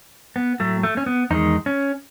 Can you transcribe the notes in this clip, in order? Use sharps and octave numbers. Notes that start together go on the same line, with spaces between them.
B3
A2 F#3 A3
A3
C#4
B3
E2 D#3 G#3 D#4
C#4